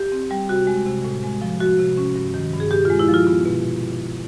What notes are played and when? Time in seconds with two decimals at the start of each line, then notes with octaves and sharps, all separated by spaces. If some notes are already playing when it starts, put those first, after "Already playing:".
Already playing: G4
0.12 C4
0.31 G3
0.49 C3 F#4
0.67 G#3
0.86 C3
1.04 A2
1.23 G#3
1.42 F3
1.60 F3 F#4
1.78 C3
1.97 C#4
2.16 G2
2.34 D#3
2.53 G2
2.60 G#4
2.71 A#2 G4
2.85 G#3 F4
2.99 E4
3.09 F3 F4
3.27 B3 F4
3.45 B2